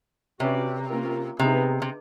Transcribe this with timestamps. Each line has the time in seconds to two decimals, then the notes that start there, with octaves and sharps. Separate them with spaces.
0.40 C3 C#4 F#4 B4 D5
0.90 A#3 C#4 F4 A#4
1.39 C3 B3 D#4 G#4 B4
1.82 C3